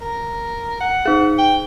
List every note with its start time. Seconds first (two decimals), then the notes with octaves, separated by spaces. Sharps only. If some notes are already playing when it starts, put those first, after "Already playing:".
0.01 A#4
0.80 F#5
1.06 D#4 G#4
1.38 G5